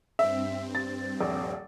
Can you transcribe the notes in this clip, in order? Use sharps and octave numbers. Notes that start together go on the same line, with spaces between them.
G2 C4 E5
A6
D#1 A#1